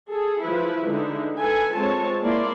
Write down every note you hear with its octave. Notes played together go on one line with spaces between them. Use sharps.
G#4 A4
F3 E4 B4
D3 G#3 D#4 E4
A4 B4 G#5
G#3 C4 F4 C#5 A5
A#3 E4 D5 C6